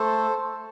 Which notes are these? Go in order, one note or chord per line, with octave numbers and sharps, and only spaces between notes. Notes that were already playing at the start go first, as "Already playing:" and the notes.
Already playing: A3 A4 C5